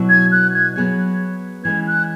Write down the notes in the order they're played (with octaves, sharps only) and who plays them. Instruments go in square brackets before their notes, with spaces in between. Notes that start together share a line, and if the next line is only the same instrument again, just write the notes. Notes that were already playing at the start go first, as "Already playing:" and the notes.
Already playing: [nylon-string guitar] B2 F#3 E4 C#5
[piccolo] G#6
F#6
G#6
[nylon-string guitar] F#3 B3 G#4 C#5
[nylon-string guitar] E3 G#3 C#4 [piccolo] G#6
[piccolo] F#6